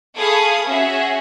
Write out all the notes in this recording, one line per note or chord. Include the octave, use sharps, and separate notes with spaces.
G#4 A4 F5 B5 C#6 D#6
C#4 F#4 G#4 E5